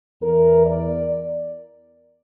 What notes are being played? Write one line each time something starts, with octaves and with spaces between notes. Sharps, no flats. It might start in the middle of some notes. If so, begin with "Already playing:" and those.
E2 E3 A#4
D5